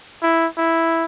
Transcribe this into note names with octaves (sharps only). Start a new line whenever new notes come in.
E4
E4